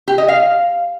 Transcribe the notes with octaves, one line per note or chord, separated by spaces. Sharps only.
G4
D#5
F5